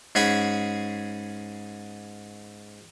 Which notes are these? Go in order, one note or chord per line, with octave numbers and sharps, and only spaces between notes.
G#2 C#4 G#4 F#5 B5 C#6